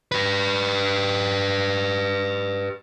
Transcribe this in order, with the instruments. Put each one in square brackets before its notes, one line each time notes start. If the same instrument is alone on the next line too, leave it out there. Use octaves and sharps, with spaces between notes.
[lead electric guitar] G4 B4